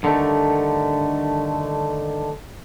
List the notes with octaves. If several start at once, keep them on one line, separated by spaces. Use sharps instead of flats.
G2 D3 D#3 G#3 A3